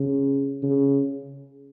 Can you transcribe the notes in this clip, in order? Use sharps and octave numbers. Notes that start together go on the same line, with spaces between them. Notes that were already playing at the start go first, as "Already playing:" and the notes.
Already playing: C#3
C#3